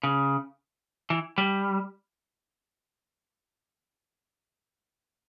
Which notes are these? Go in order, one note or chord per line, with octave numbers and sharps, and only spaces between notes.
C#3
E3
G3